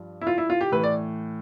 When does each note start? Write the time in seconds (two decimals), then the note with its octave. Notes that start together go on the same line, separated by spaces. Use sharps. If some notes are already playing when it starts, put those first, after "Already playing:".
Already playing: G2 F3
0.21 E4
0.27 F4
0.38 E4
0.50 F4
0.61 G4
0.72 A2 E3 B4
0.83 D5